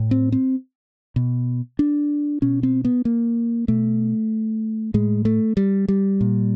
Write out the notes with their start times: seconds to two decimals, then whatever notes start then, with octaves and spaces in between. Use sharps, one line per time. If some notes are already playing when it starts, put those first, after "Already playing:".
Already playing: A2
0.11 C4
0.32 C4
1.16 B2
1.79 D4
2.42 B2 C#4
2.63 C4
2.85 B3
3.05 A#3
3.68 B2 A3
4.94 A2 G#3
5.25 A3
5.57 G3
5.88 G3
6.21 A#2